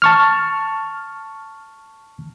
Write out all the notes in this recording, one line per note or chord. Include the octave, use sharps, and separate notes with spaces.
A5 C#6 F6